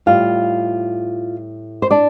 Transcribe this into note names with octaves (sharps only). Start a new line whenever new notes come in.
A2 G3 F4 F5
C5
D4 D5